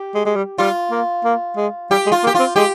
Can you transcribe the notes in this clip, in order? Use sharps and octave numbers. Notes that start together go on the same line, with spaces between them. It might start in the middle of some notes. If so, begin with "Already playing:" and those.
Already playing: G4
G#3
G#3
G3
G3 F4
A#3
A#3
G#3
G3 G4
G#3
F4
A#3
G4
C4 F4
G#3 G4